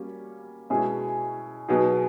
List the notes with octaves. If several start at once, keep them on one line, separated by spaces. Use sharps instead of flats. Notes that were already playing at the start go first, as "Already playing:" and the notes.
Already playing: G3 A#3 C#4 F#4
B2 G#3 C#4 E4 G#4
B2 F#3 B3 D#4 G#4